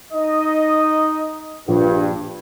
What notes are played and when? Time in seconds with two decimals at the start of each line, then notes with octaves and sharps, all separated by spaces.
0.13 D#4 D#5
1.68 A#1 G2